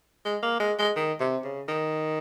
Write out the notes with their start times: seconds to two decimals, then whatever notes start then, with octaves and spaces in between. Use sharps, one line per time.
0.25 G#3
0.43 A#3
0.60 G#3
0.78 G#3
0.96 D#3
1.20 C3
1.44 C#3
1.68 D#3